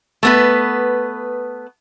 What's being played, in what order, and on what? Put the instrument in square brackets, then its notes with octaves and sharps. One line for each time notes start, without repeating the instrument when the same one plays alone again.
[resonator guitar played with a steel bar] A3 B3 B4